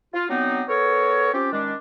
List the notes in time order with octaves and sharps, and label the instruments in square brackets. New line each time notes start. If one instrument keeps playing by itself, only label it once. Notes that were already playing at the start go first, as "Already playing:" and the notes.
[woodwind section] F4
F#3 B3 C4 D4 D#4
B3 A4 A#4 C#5
C4 C#4 F4 G4
D#3 G#3 C#4 D4